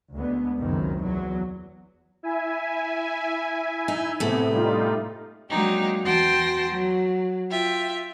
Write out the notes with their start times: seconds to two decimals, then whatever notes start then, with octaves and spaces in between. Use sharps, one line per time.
0.13 D2 D3 G#3 B3
0.59 F#1 C#2 F#2 C3 D#3
1.01 E2 F#3
2.23 E4 E5 G#5
3.88 D#4
4.20 A2 C3 A3 B3
4.51 G3 D#4 F4
5.50 F#3 G#3 A#3 D4 D#4 G4
6.03 E2 F#4 G5 A5 C6 A#6
6.69 F#3
7.49 F4 E5 G5